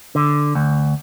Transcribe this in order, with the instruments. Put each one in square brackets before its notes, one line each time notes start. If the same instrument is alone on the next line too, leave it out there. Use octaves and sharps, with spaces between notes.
[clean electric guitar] D3
D2